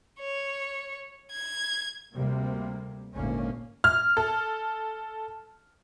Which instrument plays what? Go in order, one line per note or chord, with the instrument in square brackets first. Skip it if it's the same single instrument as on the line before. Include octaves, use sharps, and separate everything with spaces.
[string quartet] C#5
G#6
[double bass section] D2 C3 G3 A#3
G#1 D2 A#2 A#3 C#4
[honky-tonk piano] F6
A4